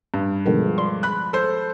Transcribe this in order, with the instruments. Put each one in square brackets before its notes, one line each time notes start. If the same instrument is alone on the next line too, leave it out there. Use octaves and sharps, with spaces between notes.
[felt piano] G2
[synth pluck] B2 D3 D#3 [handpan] F3 G#3 B3
[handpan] D5 [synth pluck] C6
[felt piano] B5 F#6
A4 C5